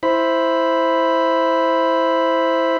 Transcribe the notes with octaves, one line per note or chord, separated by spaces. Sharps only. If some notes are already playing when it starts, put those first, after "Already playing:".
E4 C5 B5